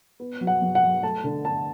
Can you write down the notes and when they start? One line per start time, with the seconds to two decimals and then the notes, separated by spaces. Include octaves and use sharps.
0.20 B3
0.41 F#3
0.47 F#5
0.62 F#3
0.75 F#5
0.82 F#3
1.03 A3 A5
1.24 D3
1.45 D3 A5